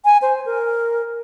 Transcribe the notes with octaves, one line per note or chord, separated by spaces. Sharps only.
G#5
C5
A#4